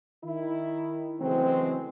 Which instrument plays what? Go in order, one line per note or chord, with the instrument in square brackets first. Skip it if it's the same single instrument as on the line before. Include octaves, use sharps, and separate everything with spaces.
[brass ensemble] D#3 E4
C#3 E3 F#3 G#3 A3 C4